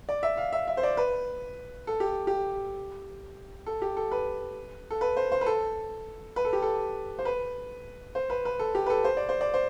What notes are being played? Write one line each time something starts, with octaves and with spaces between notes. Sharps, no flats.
D5
E5
F5
E5
E5
C5
D5
B4
A4
G4
G4
A4
G4
A4
B4
A4
B4
C5
C5
B4
A4
B4
A4
G4
A4
C5
B4
C5
B4
B4
A4
G4
B4
A4
C5
D5
C5
D5
C5